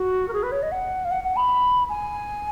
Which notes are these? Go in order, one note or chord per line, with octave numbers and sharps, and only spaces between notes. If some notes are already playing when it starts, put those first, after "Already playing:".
Already playing: F#4
A#4
G#4
B4
C#5
D#5
F#5
F5
F#5
F#5
B5
G#5